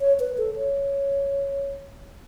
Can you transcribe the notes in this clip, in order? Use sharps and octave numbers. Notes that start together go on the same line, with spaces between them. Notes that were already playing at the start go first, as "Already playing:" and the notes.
C#5
B4
A4
C#5